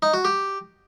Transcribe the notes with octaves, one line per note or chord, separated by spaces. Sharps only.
D#4
F#4
G4